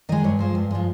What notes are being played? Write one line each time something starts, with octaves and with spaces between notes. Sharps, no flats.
D#3 G#3 D#5
G2 C#5
F3 G#3 C5
G2
F3 G#3